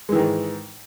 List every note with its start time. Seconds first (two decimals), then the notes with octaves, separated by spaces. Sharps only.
0.09 G#3
0.12 E3
0.15 D#3
0.18 G#2